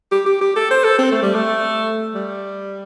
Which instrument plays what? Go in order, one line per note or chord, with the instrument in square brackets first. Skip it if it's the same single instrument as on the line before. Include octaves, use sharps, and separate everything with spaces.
[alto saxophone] G4
G4
G4
A4
C5
A4
C4
A3
G3
A3
G3